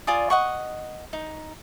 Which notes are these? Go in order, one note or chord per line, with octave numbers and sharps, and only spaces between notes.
F4 D5 G#5 D#6
D#5 F#5 C#6
D#4